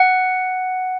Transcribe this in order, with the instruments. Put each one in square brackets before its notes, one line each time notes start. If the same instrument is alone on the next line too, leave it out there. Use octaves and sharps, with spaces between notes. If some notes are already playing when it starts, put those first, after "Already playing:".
Already playing: [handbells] F#5